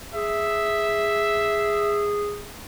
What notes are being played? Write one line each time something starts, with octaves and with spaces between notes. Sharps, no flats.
G#4 E5